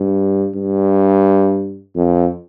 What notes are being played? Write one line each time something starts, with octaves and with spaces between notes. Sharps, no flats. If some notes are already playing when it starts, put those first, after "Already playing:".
Already playing: G2
G2
F2